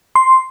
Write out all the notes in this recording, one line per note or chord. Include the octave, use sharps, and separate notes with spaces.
C6